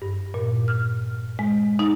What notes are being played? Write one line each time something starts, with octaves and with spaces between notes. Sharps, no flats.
G2
A#2
F6
G#3
D#4